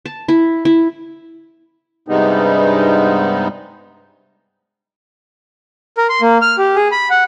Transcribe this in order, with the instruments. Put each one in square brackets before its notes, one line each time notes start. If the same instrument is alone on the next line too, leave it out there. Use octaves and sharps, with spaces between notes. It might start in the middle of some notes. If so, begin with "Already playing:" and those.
[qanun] A5
E4
E4
[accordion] G2 C3 G3 G#3 B3 D#4
[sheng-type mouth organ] A#4
C6
A#3
F6
G4
G#4
B5
F#5